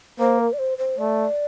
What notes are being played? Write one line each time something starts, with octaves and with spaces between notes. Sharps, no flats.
A#3 C5
A#4
D5
C5
C5
A3 D5